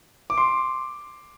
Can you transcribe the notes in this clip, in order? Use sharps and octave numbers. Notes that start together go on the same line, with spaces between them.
D6
C6